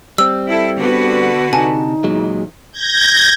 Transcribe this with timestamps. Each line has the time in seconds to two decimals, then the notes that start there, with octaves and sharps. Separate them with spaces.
0.18 G3 C4 E6
0.49 E4 A4
0.78 D3 B3 F#4 B4
1.53 C3 D#4 G#5 A5
2.04 E2 A#2 F#3 G#3
2.71 G6 G#6 A#6